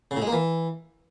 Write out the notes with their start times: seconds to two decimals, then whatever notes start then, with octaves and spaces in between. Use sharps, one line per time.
0.11 C#3
0.17 A2
0.22 G#3
0.27 A#3
0.33 E3